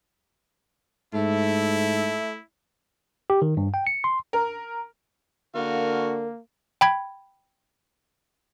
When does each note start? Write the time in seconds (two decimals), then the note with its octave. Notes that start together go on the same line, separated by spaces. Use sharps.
1.14 G#2 A3 E4
3.30 G4
3.42 D#3
3.57 G2
3.74 G5
3.87 C#7
4.04 C6
4.33 A#4
5.55 D3 A#3 F#4 A#4 F5
6.81 G5 B5 G#6